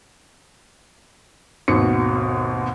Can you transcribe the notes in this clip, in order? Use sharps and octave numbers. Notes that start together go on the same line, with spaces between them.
G#1 D#2 B2 C#7